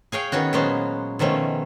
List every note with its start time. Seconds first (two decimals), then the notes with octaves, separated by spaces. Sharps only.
0.12 G#4 C#5 F5 G5
0.32 D#3 B3 C#4 F#4
0.53 A#2 F#3 G#3 B3 C#4 C5
1.19 B2 D#3 F3 A3 C#4